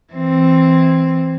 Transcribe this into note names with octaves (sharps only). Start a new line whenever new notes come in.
E3 C4